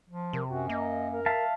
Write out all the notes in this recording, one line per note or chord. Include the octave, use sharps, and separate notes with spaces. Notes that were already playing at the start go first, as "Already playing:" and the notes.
F3
C3 A#4
F#2 F#4
A#3 D#5
A#4
E5 F5 A5